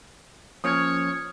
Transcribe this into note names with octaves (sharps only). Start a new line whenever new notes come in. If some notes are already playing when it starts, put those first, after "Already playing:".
F3 A#3 C#4 C#5 D#6 F6 G#6